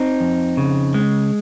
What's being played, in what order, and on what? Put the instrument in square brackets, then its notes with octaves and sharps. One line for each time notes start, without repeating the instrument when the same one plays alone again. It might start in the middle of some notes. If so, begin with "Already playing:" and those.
Already playing: [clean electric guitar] C4 D#4
F2
C#3
G#3